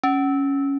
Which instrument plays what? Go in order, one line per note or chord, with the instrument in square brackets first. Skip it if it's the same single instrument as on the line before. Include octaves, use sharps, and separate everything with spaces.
[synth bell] C#4